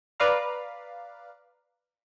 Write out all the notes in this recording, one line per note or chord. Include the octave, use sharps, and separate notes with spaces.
B4 D5 F5 A#5